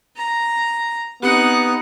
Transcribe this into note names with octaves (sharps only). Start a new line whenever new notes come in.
A#5
B3 C4 D#4 G4 F#5